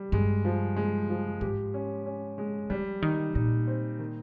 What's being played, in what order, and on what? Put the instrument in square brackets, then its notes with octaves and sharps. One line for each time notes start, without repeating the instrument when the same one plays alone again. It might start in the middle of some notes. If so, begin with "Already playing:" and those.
Already playing: [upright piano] G3
[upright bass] G2 [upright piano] G#3
[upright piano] F3
G#3
F3
[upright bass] G#2 [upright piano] G4
[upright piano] C#4
C#4
G#3
[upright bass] F3 [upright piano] G3
[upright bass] D#3 [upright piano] D#4
[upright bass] A#2 [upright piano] D#4
[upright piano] C4
D#3